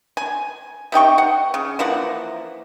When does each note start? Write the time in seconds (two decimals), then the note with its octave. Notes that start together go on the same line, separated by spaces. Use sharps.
0.17 G#5
0.92 C3 D#4 G5 C#6
1.18 F#5
1.54 C#3
1.79 E3 F3 A#3 F#5